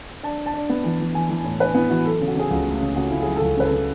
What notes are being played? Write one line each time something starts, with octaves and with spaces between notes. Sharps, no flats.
D4 A5
D4
A5
D4
B3
E3
E3
E3 G#5
E3
A2
D4 B4
B3 E4
E3 F#4
F#3 A4
C#3
F#4
C#3 G#4
C#2 F#4
A3
C#3
C#3 F#4
C#3 E4
G#4
F#3 F#4
A4
C#2 G#4
C#3 B4
A4
C#3